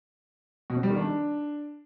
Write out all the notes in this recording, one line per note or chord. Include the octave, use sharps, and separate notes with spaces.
B2
C4
G3
D#3
D4